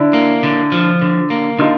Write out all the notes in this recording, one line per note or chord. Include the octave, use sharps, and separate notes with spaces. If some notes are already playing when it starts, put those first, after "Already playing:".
Already playing: D3 D4 E4
A#3
D3
F3
D3
A#3
D3 D#4 F4